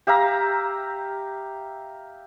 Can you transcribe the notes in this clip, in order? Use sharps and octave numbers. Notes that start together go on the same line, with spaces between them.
G4 E5 F5 A#5